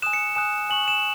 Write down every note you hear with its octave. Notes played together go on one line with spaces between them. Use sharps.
G#5 D#6 F#6 E7
C#7
G#5 D#6 F#6 E7
G#5 C#6 F#6 F#7
E7